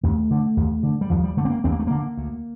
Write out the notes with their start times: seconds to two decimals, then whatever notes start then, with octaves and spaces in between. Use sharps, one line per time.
0.03 D#2 A3
0.31 D3
0.57 D#2
0.83 D3
1.01 G3
1.10 D#2 F3
1.24 G3
1.37 D3 A3
1.45 C4
1.50 A#3
1.64 D#2 C4
1.72 A#3
1.80 A3
1.87 D3 A#3
2.17 D2